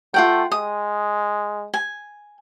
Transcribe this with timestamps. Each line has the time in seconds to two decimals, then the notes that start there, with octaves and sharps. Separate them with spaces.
0.14 A3 F4 F#5 G5
0.52 G#3 D#6
1.74 G#5